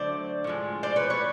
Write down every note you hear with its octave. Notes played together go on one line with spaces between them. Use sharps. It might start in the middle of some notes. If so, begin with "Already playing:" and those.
Already playing: D3 F#3 A3 C5 D5
A2 F3 G#3
C5 D5
B4 C#5
B4 C#5